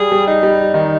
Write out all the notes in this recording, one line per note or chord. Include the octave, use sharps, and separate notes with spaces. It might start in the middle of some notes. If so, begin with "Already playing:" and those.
Already playing: G3 G#4
G3
D#4
G3
D#3 D#4